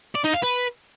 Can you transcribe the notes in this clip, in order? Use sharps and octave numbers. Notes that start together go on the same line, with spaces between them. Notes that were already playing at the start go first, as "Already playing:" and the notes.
D5
D#4
F5
B4